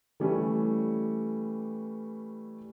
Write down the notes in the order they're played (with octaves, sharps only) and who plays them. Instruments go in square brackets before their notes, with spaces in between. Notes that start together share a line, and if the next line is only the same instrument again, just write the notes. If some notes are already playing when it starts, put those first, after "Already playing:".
[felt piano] E3 G3 A3 C#4